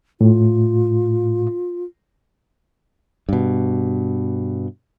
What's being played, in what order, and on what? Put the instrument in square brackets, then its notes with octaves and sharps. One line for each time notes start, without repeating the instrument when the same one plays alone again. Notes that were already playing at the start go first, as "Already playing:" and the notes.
[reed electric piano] A2 [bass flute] F4
[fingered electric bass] G2 B2